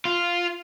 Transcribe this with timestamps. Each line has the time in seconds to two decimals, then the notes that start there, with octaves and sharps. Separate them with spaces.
0.05 F4